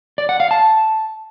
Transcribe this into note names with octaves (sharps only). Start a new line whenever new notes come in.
D5
F#5
F5
A5